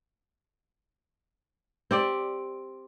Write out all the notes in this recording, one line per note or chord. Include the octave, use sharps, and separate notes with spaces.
C4 G4 D5